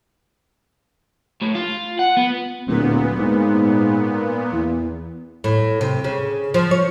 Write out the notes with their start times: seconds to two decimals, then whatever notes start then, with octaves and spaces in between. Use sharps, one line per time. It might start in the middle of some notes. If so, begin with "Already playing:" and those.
1.41 A2
1.55 F4
1.99 F#5
2.17 B3
2.67 D1 A#2 B3
3.19 G#2
4.52 E2
5.44 A2
5.81 C3
6.04 C#3
6.54 F3
6.71 C#5